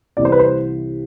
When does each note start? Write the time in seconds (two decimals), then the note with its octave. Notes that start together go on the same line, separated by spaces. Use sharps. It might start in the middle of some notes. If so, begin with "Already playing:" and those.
0.17 C2 C3 E3 D5
0.25 C5
0.32 B4
0.39 C5